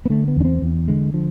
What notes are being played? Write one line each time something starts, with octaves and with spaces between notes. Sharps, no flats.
B3
D3 A3
B3
E2 D4
C4
E2
D3 G#3
D3 F3